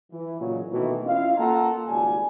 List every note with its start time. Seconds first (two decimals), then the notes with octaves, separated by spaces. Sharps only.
0.11 E3
0.40 A#2 C#3 F#3 D#4
0.71 B2 D#3 E3 A3 D#4
1.04 C#4 E4 F4 D#5 F5
1.38 A#3 F4 A4 F5 F#5 A#5
1.87 G#1 C#2 G3 G#5